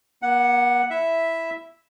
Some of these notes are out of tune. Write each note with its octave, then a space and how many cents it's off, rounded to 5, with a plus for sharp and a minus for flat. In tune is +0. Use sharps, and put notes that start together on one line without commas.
A#3 +40 F#5 +0
E4 +0 E5 +0